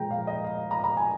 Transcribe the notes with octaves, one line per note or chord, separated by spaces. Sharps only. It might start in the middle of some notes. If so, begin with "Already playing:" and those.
Already playing: A#2 F3 G#3 G5 A#5
F5
D#5
F5
A#5
A#5
G#5